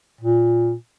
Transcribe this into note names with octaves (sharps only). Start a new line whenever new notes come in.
A#2